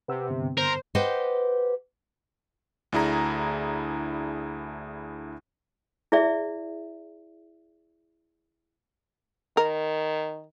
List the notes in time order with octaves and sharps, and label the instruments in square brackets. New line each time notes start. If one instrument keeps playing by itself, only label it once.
[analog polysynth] C3 [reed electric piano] B4 F#5 E6
[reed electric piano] G2 D3 B3
[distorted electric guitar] A#4 [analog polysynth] C5
[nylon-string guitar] G4 B4 C5 D#5 F#5 G5
[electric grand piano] D2 D4 E4 G#4 A#5
[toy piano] E4 G#4 D5 E5
[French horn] D#3 [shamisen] A#4